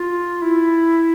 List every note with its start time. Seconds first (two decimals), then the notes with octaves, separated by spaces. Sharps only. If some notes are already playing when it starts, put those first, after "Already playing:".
Already playing: F4
0.42 E4